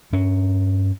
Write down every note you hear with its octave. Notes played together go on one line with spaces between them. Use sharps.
G2 C#4